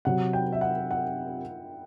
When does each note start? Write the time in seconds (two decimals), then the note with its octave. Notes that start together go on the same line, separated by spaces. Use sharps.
0.05 C3 F#3 C4 F#5
0.33 G5
0.52 E5
0.61 F#5
0.91 F#5